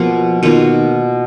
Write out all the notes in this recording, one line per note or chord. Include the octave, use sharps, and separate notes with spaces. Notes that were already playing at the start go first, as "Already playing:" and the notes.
Already playing: B2 F3 A#3 F4
B2 D#3 A#3 F4